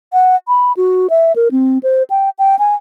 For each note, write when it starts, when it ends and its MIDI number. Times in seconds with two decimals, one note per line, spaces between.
0.13 0.36 78
0.48 0.72 83
0.77 1.07 66
1.10 1.33 76
1.36 1.48 70
1.51 1.78 60
1.83 2.03 72
2.10 2.30 79
2.39 2.56 79
2.59 2.75 80